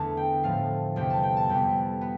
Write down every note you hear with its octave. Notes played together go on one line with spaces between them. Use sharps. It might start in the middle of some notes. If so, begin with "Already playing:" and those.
Already playing: E2 D3 A3 A5
G5
A2 F3 A3 F5
E2 C3 G3 G5
A5
G5
A5
F2 C3 G3 B3 G5
B3